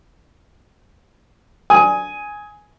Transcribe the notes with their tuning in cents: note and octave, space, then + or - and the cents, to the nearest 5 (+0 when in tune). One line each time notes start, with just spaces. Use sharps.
G#5 +0 D#6 +25